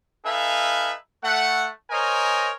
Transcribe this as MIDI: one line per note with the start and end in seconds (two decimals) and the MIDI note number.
0.25 0.93 63
0.25 0.93 69
0.25 0.93 71
0.25 0.93 76
0.25 0.93 77
0.25 0.93 80
1.23 1.67 57
1.23 1.67 78
1.90 2.51 70
1.90 2.51 72
1.90 2.51 73
1.90 2.51 75
1.90 2.51 80
1.90 2.51 82